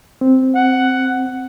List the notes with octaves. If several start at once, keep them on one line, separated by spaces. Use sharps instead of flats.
C4
F#5